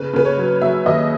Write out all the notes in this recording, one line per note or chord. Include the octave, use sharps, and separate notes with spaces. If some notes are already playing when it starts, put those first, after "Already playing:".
Already playing: C#3 B4
C#3 B4
C#5
F#3
F#3 E5
D#2 D#5